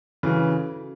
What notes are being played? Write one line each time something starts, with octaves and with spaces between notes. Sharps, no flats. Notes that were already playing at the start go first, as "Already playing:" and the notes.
C#3 E3 F#3 C#4 F#4 A4